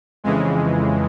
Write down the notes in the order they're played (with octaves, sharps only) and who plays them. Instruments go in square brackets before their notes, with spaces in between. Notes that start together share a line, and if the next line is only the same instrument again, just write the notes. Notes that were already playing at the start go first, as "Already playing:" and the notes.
[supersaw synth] F2 C#3 E3 G#3